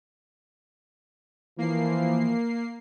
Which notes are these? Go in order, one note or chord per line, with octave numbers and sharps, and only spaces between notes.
E3 F3 A#3 C7